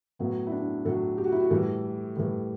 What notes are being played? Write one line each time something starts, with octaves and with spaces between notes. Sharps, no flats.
A2 F#3 B3
E4
D4
A2 F#3 A4
G4
F#4
E4
F#4
A2 E3 G3 A4
A2 E3 G3